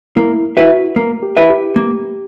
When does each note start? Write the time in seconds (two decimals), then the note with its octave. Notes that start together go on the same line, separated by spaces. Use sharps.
0.16 A#3 E4
0.57 E4 F#4 B4 E5
0.96 A#3
1.23 G4
1.37 E4 B4 E5
1.50 G4
1.76 A#3